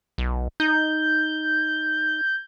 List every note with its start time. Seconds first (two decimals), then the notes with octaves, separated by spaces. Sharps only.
0.18 B1
0.60 D#4 G6